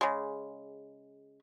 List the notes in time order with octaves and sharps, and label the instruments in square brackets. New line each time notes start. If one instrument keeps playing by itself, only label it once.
[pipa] C#3 G#3